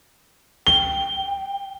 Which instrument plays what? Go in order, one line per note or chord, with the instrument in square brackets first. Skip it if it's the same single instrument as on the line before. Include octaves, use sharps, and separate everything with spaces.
[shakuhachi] G5 [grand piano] G7